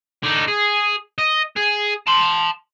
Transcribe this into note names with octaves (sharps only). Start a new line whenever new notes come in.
D3 D#4
G#4
D#5
G#4
A5 C6